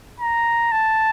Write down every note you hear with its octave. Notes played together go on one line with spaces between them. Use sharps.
A#5
A5